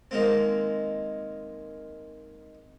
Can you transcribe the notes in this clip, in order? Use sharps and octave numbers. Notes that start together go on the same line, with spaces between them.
D#3 G#3 A#3 C4